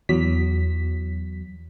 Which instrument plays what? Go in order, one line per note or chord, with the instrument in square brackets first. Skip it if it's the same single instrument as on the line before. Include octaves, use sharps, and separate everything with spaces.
[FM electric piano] E2 F#3 B6